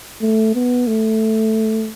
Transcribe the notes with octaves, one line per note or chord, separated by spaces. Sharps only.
A3
B3
A3